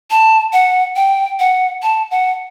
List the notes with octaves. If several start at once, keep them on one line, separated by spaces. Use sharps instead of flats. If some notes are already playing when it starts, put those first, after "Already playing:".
A5
F#5
G5
F#5
A5
F#5